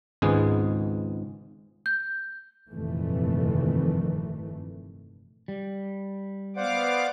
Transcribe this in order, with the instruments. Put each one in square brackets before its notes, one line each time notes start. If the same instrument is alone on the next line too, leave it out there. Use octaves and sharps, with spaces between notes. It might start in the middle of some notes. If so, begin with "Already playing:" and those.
[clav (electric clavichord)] G#1 C#2 G#2 G#3 B3 G#4
[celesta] G6
[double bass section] F1 G2 A#2 D#3 E3 A3
[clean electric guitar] G3
[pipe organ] B3 F5 D6 [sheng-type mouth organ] C5 D5 F#5